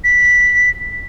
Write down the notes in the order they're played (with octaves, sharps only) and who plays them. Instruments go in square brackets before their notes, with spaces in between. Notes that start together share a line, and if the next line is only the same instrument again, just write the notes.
[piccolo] B6